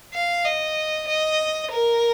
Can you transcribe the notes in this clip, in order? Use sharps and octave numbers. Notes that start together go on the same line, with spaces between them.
F5
D#5
D#5
A#4